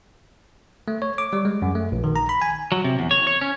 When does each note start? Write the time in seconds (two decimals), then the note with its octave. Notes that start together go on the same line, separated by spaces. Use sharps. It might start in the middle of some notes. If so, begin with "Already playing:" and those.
0.88 A3
1.02 C#5
1.18 D6
1.33 G3
1.45 G#3
1.62 F#2
1.75 A3
1.92 A#1
2.04 D#3
2.16 A#5
2.29 B5
2.42 G#5
2.72 F#3
2.84 C3
2.99 E2
3.11 C#5
3.27 C#5
3.41 C#4